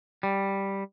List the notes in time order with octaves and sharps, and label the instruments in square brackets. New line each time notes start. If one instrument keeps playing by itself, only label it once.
[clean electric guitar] G3